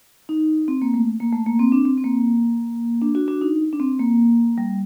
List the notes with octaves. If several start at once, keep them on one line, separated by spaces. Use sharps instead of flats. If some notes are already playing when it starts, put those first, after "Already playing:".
D#4
C4
A#3
A3
A#3
A3
A#3
C4
D4
C4
C4
A#3
D4
D4 F#4
D4 F#4
D#4
D4
C4
A#3
G3